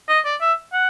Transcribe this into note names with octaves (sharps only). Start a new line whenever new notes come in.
D#5
D5
E5
F#5